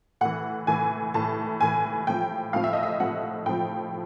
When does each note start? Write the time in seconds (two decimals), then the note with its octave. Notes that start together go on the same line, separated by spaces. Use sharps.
0.21 A2 E3 F#5
0.67 A2 E3 G#5
1.14 A2 E3 A5
1.61 A2 E3 G#5
2.07 A2 F3 G5
2.53 A2 F3 F5
2.64 E5
2.73 D#5
2.83 E5
3.00 A2 F3 F#5
3.46 A2 F3 G5